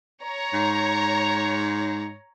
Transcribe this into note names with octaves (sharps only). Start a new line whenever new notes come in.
C#5 A#5
G#2